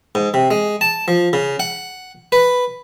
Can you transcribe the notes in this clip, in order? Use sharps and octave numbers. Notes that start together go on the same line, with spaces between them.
G#2
C3
G#3
A5
F3
C#3
F#5
B4